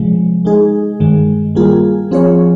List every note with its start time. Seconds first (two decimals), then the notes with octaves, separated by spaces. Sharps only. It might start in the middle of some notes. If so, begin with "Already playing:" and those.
Already playing: C3 F3 G#3
0.45 G#3 D#4 G#4
1.00 G2 D#3 G#3
1.55 G3 A#3 F4 G#4
2.11 F3 C4 F4 G#4 C#5